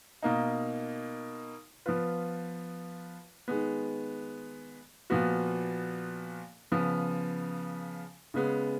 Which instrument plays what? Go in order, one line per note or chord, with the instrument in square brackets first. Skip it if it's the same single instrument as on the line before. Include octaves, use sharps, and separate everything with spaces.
[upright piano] B2 A#3 D#4
F3 B3 F4 B4
D#3 G#3 B3
A#2 F3 B3 F#4
C#3 F3 B3
C#3 G#3 B3